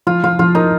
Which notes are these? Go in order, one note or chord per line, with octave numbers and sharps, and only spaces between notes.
F3 F4
F3 F4
F3 F4
D#4 A#4